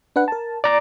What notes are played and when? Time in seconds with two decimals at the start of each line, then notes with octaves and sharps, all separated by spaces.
0.16 D4 B4 F#5
0.28 A#4 A5
0.64 D5 A#5 D6